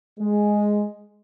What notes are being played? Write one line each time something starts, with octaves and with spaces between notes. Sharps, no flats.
G#3